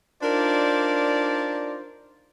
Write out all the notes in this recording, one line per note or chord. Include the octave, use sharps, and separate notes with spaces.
D4 D#4 F4 A#4 C5 D5